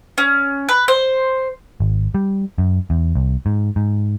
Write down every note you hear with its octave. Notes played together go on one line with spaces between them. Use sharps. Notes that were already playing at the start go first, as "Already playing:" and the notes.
C#4
B4
C5
G#1
G3
F#2
E2
C2
G#2
G#2